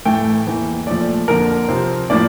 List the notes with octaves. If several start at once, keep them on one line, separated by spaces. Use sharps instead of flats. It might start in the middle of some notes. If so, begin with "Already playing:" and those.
A2 E3 A3 G5
E2 E3 A#3
A#2 F3 A3 D5
F2 D3 F3 A#3 A#4
C3 F3 C4
A2 F3 A#3 D5